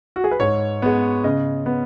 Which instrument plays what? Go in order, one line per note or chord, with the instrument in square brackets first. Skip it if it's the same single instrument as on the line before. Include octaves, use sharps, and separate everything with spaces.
[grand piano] F#4
G#4
B4
G#2 C#5
G#3 B3
C#3 D#5
B3